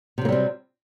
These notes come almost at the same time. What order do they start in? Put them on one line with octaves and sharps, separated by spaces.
C3 F#3 A#3 G3 C4